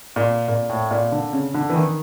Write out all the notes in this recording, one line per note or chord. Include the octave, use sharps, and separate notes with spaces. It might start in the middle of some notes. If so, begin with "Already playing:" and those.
A#2
A#2
A2
A#2
D3
C#3
D3
E3
D#3